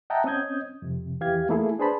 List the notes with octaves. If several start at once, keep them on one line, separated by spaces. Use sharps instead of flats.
D#5 E5 F#5 G5 A5 A#5
C4 C#4 D#5 D#6 G6 G#6
F2 C3
E2 E3 G4 F5 G#6
A3 A#3 E4 G#4 A4
D4 G#4 B4 C5 A5 B5